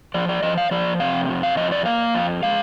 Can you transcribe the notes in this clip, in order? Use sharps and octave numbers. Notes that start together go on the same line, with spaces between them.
F3 D5
D5
F3 D#5
F5
F3 D5
C3 F5
F2
F5
F2 D#5
D5
A#3 F5
F2
G#3 F5